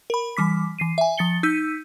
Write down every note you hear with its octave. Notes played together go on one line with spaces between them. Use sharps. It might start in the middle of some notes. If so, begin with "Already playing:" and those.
A#4 B5
E3 G3 D6 B6
E3 C7 D#7
E5 G#5
F3 A6 C#7 G7
D#4 E6 G6 B6 D#7